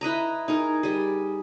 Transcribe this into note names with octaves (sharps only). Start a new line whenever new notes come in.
E4 B4 D#5 A#5
D#4 G#4 A#4
G3 G#4